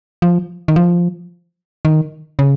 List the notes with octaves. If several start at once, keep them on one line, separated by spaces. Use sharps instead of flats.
F3
D#3
F3
D#3
C#3